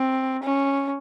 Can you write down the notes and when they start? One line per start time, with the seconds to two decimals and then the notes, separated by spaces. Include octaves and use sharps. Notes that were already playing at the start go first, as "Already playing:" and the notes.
Already playing: C4
0.42 C#4